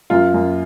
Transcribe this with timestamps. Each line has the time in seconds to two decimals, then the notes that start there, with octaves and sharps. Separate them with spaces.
0.10 F#2 F4
0.34 F#2